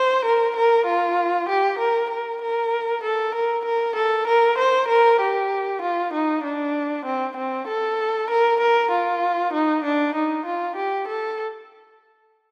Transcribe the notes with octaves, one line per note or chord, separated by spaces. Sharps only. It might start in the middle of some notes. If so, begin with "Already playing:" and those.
Already playing: C5
A#4
A#4
F4
G4
A#4
A#4
A#4
A4
A#4
A#4
A4
A#4
C5
A#4
G4
F4
D#4
D4
C4
C4
A4
A#4
A#4
F4
D#4
D4
D#4
F4
G4
A4